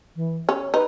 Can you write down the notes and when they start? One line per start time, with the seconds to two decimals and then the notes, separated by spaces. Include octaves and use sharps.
0.16 E3
0.49 C#4 C#5
0.74 D#4 B4